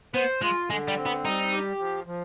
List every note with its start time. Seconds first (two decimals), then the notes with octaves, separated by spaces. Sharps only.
0.14 B3 C5
0.42 G#3 F4
0.69 D3 G#3
0.88 G3
0.97 C4
1.06 B3
1.24 G3 D#4
1.52 G4
1.79 F3
2.07 F3